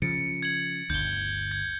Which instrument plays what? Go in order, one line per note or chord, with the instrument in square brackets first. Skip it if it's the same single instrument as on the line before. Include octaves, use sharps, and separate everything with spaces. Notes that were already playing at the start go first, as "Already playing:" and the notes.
[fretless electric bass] C#3 F3 [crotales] A6 C#7 D7
[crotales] G#6 C#7 F#7
[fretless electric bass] G1 D2 [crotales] G6 G7
[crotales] G#6